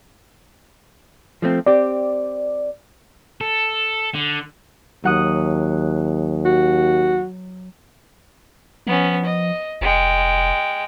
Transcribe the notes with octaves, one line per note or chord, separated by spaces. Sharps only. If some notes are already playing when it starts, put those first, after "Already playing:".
F3 A3 C4
C4 G4 D5
A4
D3
D#2 F#3 F#5 D#6
F#4
F3 B3 C#4
D#5
F1 G#3 G5